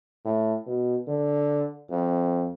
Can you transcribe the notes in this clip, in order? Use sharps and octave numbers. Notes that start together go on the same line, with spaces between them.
A2
B2
D3
F2